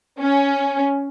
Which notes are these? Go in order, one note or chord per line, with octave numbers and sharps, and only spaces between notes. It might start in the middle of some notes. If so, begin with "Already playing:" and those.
C#4